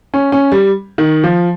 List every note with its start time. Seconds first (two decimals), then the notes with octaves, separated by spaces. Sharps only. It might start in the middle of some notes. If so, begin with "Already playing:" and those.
0.14 C#4
0.32 C#4
0.52 G3
0.98 D#3
1.24 F3